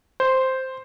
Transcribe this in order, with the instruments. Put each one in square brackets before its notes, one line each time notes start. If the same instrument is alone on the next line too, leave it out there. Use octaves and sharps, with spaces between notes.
[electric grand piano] C5